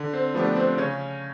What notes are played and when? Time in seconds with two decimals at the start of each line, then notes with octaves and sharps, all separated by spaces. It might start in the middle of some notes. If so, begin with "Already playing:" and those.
Already playing: D3
0.13 C4
0.34 F3 A3 B3 D4 G4
0.56 C4
0.78 C#3 C#4